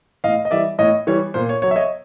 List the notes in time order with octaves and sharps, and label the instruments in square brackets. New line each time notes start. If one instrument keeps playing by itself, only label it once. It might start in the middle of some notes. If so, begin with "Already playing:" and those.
[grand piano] A2 D#5 F5
D#5
E3 G3 D5 E5
A2 C#5 D#5
E3 G3 C#5
A#2 C5
C#5
F#3 C#5
E5
C#5 D#5